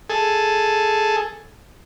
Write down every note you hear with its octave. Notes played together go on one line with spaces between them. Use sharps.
G#4 A4